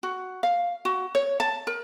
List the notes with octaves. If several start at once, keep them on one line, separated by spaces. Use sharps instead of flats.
F#4
F5
F#4
C#5
A5
A#4